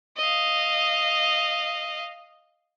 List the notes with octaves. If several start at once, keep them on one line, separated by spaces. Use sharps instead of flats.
D#5 F5